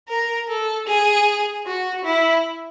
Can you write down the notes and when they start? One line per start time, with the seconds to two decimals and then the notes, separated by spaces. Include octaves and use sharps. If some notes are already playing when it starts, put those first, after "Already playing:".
0.08 A#4
0.48 A4
0.87 G#4
1.66 F#4
2.04 E4